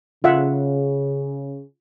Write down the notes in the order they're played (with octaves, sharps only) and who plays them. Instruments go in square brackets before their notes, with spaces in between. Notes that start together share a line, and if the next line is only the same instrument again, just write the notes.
[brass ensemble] C#3 [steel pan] F4 E5 F#5